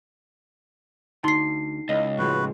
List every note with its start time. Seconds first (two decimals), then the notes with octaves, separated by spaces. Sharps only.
1.24 D2 D#4 C6 C7
1.89 C#2 E4 D#5
2.18 A2 F3 G#3 F#4 B4